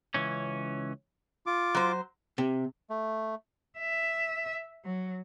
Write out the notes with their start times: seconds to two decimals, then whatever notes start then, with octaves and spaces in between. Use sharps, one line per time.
0.14 C#2 E3 C#4
1.46 F4 D6
1.75 F#3 C5
2.38 C3
2.90 A3
3.79 E5
4.85 F#3